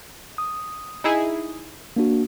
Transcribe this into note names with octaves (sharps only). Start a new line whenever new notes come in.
D#6
D#4 E4 G#4
A#3 D4 F#4